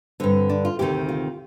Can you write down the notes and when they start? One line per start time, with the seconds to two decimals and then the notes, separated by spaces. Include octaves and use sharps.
0.20 G2 D3 C4
0.49 D4
0.65 F4
0.79 D2 C3 D#3 G4
1.09 F4